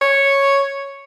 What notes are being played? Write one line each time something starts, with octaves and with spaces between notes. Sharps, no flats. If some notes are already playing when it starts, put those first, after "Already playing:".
C#5